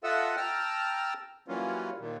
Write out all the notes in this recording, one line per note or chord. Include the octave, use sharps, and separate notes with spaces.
F4 A4 D#5 E5 F#5 E6
G5 A5 A#5 E6 F6
E3 F#3 G3 A#3 C#4 F4
D#2 A#2